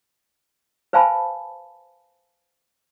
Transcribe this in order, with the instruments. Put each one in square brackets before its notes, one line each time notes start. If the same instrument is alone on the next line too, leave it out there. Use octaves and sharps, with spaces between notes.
[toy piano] B4 C5 F5 G#5 A5 B5